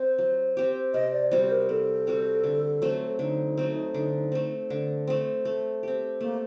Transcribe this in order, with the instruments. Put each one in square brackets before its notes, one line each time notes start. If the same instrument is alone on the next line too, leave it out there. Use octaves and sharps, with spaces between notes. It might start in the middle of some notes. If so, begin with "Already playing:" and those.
Already playing: [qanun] C4 [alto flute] C5
[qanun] F#3
C4 G4
[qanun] C3 [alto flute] D#5
[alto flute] D5
[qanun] G3 C4 F#4 [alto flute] C5
[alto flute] A#4
[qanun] C3 [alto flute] A4
[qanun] G3 C4 F#4
D3
F#3 A3 C4
[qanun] D3 [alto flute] D#4
[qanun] F#3 A3 C4
D3
A3 C4
D3
A3 C4
A3
C4 G4
[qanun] A3 [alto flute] A#3